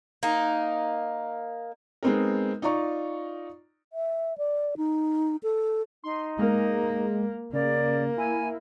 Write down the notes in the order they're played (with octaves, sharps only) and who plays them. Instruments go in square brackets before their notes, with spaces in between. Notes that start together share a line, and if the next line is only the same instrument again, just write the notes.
[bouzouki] A#3 D#4
[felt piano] G#3 B3 C4 D#4 A#4
D#4 F4 D5 A#5 C#6
[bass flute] E5
D5
D#4
A4
[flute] D#4 [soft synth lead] C6
[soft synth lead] G#3 [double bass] A#3
[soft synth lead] C#3 [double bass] A#3 [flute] D5
[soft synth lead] E4 [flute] G#5